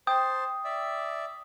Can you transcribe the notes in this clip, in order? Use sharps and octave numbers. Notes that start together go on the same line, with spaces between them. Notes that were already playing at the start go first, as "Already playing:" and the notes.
C5 G5 A5 D#6
D5 E5